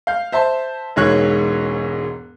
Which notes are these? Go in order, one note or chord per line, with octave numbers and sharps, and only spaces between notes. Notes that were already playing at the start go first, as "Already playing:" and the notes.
F5 G6
C5 E5 A5 C6
E1 G#2 A#3 C#5 F#6 G#6